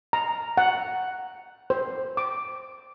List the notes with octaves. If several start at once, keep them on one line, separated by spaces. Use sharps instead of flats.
A#5
F#5
C5
D6